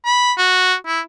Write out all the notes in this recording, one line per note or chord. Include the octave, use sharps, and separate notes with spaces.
B5
F#4
E4